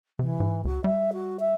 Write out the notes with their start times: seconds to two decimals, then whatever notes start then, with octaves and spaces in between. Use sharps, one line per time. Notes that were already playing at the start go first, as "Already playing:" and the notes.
0.19 C3 E3
0.40 G#2
0.65 C#2 F#4
0.84 G3 E5
1.13 F#4
1.39 E5